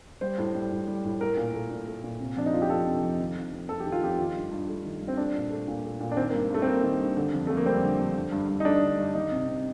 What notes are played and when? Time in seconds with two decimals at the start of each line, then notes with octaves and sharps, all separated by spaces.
0.21 G3 C5
0.38 A2
0.55 G3
0.71 A2
0.88 G3
1.04 A2
1.21 A3 A#4
1.37 A#2
1.54 A3
1.71 A#2
1.87 A3
2.03 A#2
2.20 C3
2.36 F2 D4
2.46 D#4
2.53 A3 F4
2.62 G4
2.70 F3 A4
2.87 C3
3.03 F2
3.19 D#3
3.36 F2
3.53 F2
3.69 A3 A4
3.80 G4
3.86 D#3
3.92 F4
4.02 F2 G4
4.19 D#3 F4
4.35 G2
4.52 G2
4.68 A3
4.85 D#3
5.01 G2
5.08 C4
5.17 A3 D4
5.35 A#2
5.51 A3
5.68 A#2
5.84 A3
6.01 A#2
6.12 D4
6.17 D#3 C4
6.29 A#3
6.33 G2
6.50 G2 A3
6.62 C4
6.67 A3 A#3
6.83 D#3
6.99 G2
7.17 D3
7.33 F2
7.47 F2 A3
7.57 A#3
7.66 G3 C4
7.83 D3
7.99 F2
8.16 D3
8.32 G2
8.48 G2
8.60 D#4
8.65 A3 D4
8.82 D3
8.98 G2
9.15 D#3 D#4
9.31 C3
9.48 C3